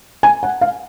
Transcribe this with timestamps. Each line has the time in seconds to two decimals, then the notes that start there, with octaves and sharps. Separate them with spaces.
0.23 G#5
0.43 F#5
0.61 F5